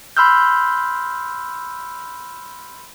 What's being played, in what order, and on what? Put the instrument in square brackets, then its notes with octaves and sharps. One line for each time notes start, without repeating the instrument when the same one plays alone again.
[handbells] B5 C6 E6 F6 G6